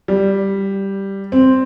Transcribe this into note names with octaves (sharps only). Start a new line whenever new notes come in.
G3
C4